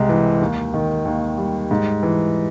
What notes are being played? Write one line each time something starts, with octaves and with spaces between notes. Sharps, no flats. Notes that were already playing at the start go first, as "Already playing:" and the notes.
Already playing: C2 C3 G#3
E3
D#2
D#3
D#2
G3
G#2
E3